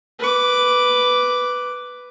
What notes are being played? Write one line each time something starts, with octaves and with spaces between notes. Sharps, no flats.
B4 D6